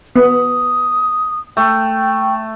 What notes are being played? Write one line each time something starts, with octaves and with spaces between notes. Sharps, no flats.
B3 D#6
A3 G5